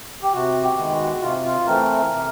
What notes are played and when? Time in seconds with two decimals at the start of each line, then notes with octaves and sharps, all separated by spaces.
0.22 G4
0.33 C3 F#4
0.63 G4
0.77 D#3 G#3 B3
0.92 F#4
1.21 C3 F4
1.46 F4
1.66 E3 A3 C4 A#4
2.11 C3